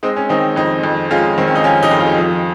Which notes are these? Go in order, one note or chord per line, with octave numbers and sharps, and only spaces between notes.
G#3 C4 D#4
C#4
D#3 C4 D#4
F2 C4 D#4
F2
G#3 C#4 F4
D#3 C4
C#4
D#4
F2 C#4 F4
D#4 G4
F2
F4 G#4
F3